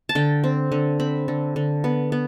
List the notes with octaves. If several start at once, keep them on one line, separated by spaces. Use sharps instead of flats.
A5
D3 G5
C4
D3
C4 B5
D3
D3
B3
B3